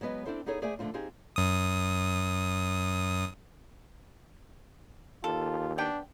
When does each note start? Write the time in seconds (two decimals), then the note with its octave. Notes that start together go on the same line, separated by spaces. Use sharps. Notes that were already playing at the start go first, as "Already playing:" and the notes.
0.01 F#3 G#3 B3 B4 D#5
0.26 C4 D4 E4 A4 C5
0.46 B3 D#4 E4 G#4 A4 C#5
0.62 A3 G#4 C5 D5 E5 G#5
0.79 D3 F3 A3 C4 F4
0.94 C4 D#4 F4 G4 G#4
1.36 F#2 D#6
5.24 D#2 F4 A4
5.78 B3 D4 G5